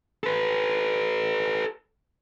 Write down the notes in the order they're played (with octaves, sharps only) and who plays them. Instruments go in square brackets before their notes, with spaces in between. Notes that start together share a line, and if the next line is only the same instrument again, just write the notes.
[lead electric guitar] A4 B4